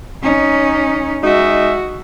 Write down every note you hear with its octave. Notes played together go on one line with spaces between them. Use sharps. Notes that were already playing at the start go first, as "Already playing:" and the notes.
C#4 D#4
G#3 D#4 F#4 E5